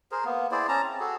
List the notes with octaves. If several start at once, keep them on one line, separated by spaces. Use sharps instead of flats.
G#4 A#4 C5
A#3 B3
E4 G#4 C5 D5
C#4 A5 A#5
C4
F#4 G#4 A4